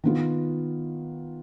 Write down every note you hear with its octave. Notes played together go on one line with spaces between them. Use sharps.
D#3 B3 F4